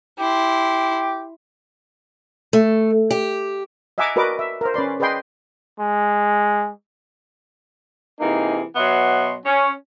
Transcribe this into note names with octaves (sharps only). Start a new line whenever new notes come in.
E4 G4 C6
A3
G4
D#5 E5 F#5 G#5 A#5 D6
F#4 A#4 B4 D5 D#5 D6
E5
A#4 C5
C#4 B4 D5 C6
G#4 B4 D5 D#5 G5 C6
G#3
C3 E3 A#3 D#4 G#4
B2 F#3 B3 E5 C6
C#4